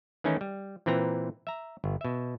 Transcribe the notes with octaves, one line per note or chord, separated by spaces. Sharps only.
D#3 E3 A3 C#4 D#4 E4
G3
A#2 E3 C4 B4 A#5
E5 A#5
G1
B2 E5